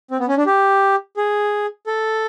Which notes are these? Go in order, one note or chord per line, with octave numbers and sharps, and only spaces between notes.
C4
B3
C#4
D4
G4
G#4
A4